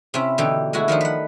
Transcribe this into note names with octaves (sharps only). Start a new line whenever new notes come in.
C3 C#4 E4
B2 D3 E3 D#4 G4
G#3 A3 E4 F#4
D#3 F3 D4 D#4
B4 F#5